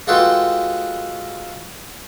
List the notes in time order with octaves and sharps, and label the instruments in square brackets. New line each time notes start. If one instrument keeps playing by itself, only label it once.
[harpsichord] G#3 F4 F#4 A4 B4 G5